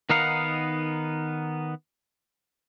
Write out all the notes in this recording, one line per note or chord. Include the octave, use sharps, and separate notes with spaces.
D#3 B3 D#4 A#4 F5 F#5